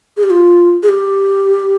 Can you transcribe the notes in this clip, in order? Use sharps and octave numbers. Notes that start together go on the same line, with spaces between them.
G#4
G4
F4
G#4
G4